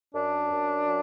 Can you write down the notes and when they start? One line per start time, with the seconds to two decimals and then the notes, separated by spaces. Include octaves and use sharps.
0.14 F#2 D4
0.51 F#2
0.87 F#3